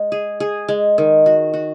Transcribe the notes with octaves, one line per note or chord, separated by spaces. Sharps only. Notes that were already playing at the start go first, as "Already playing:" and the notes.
Already playing: G#3
G#4
G#4
G#3
D#3
F#4
F#4